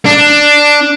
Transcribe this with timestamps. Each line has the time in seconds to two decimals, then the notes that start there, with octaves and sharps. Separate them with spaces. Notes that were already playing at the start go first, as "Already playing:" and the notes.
0.05 D4